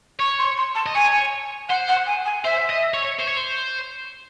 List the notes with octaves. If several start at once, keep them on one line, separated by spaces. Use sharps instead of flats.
C#5 C#6
C6
C6
A5
D#5
C#5 G#5
C5 F#5
F#5
G#5
G#5
C5 E5
D#5
C#5
C5
C#5
C5